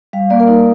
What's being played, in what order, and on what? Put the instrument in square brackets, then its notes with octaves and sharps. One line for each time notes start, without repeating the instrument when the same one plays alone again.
[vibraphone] G3 F5
A#3 D5
A#4
D#4